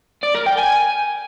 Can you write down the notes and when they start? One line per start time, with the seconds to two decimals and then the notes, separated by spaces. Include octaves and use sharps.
0.23 D5
0.35 A#4
0.46 G5
0.58 G#5